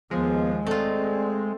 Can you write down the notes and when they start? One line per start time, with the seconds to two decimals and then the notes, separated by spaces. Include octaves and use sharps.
0.11 D#2 F3 G#3 B3
0.67 A3 C4 F4 D5